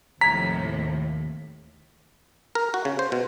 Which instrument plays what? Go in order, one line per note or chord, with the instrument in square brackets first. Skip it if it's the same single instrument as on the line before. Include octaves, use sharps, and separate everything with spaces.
[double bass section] D#2 [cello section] A2 C3 F3 [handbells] A#5 G#6 [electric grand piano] B6
[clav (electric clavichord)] A#4
F#4
C#3
C5
B2